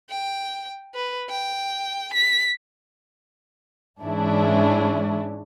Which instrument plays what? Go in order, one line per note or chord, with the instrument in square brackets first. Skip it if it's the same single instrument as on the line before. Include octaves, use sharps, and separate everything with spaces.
[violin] G5
B4
G5
B6
[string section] G#2 E3 G#3 C#4 D4 E4